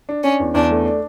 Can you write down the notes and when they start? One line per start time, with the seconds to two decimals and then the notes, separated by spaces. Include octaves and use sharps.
0.09 D4
0.23 C#4 D4
0.40 E2
0.54 E2 D4
0.71 A3
0.85 D4